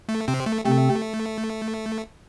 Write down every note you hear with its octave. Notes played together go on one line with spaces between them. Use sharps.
A3
C3 C4
A3
C3 A3 C4